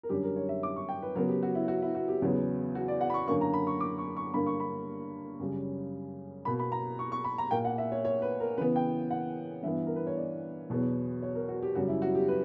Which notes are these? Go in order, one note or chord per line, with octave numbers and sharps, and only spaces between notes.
A#4
F#2 D3 G3 G4
A#4
C#5
E5
D6
C#6
G5
B4
C#3 F#3 B3 A#4
G4
F#4
E4
F#4
E4
F#4
G4
E2 C#3 F#3 B3
F#4
D5
F#5
B5
C#6
F#2 D3 A#3 C#6
A#5
B5
C#6
D6
C#6
C#6
G2 D3 A#3 B5
C#6
B5
F#2 C#3 G3
B2 A#3 B5
B5
A#5
C#6
C#6
B5
A#5
A#2 A#3 G5
F#5
E5
C#5
C#5
B4
A#4
C#3 E3 B3 B4
G5
F#5
G2 E3 B3 E5
A#4
B4
C#5
D5
E2 B2 F#3 B3
C#5
A#4
F#4
G4
F#2 C#3 G3 F#4
E4
F#4
G4
B4